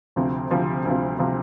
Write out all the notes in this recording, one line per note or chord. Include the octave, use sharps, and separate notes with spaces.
D2 C3 F3 C4
D2 C3 F3 C4
D2 C3 F3 C4
C3 F3 C4